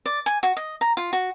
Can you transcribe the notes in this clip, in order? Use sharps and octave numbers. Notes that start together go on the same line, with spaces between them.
D5
G#5
F#4
D#5
A#5
F4
F#4